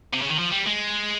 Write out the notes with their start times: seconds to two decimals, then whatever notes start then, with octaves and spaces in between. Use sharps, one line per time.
0.13 C3
0.21 C#3
0.29 D#3
0.38 F3
0.51 G3
0.66 G#3